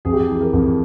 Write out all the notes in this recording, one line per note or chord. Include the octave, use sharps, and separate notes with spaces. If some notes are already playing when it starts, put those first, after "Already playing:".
F2 G#4
G4
G#4
E3
A#4
F2